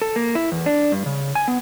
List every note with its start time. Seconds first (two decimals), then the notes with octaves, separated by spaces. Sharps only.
0.02 A4
0.16 A#3
0.35 E4
0.52 E2
0.66 D4
0.92 G2
1.06 C#3
1.35 G#5
1.48 B3